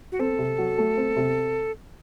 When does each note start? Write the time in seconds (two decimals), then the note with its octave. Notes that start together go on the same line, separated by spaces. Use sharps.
0.12 F#4
0.19 C4 A4
0.38 C3
0.58 F#3
0.78 A3
0.97 C4
1.16 C3